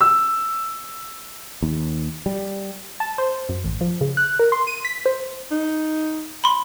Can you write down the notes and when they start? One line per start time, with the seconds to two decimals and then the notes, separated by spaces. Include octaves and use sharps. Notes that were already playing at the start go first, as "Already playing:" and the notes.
0.01 E6
1.62 D#2
2.26 G3
3.00 A5
3.18 C5
3.49 F#2
3.64 A1
3.81 F3
4.01 C#3
4.17 F#6
4.39 A#4
4.52 C6
4.67 D#7
4.85 B6
5.06 C5
5.51 D#4
6.44 B5 C6